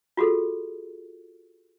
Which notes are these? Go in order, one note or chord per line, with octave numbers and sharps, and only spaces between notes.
F4 F#4 G#4 A4